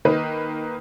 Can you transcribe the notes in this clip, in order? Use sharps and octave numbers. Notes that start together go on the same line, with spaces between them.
D#3 A#3 D#4 B4